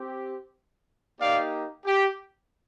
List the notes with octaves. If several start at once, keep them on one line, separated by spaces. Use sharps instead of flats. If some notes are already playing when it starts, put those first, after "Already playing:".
Already playing: C4 G4
A#3 D#4 G4 D5 F5
G4